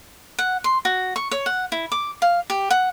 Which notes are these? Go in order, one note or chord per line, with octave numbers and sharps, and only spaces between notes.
F#5
C6
F#4
C#6
C#5
F#5
E4
D6
F5
G4
F#5